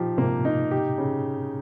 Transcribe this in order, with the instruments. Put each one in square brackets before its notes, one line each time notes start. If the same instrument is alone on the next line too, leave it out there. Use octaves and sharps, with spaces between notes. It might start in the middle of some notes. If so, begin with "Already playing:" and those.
Already playing: [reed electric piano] A#2 [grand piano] F3 D#4 G4
[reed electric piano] G#2 C3 [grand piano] A#3
[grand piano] D#4
G4
C#3